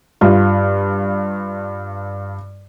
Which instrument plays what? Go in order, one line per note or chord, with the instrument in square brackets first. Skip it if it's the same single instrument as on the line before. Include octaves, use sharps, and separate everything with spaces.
[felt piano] G2 F4